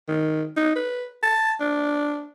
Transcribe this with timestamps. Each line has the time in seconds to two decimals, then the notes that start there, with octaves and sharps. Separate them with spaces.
0.09 D#3
0.57 D#4
0.76 B4
1.23 A5
1.60 D4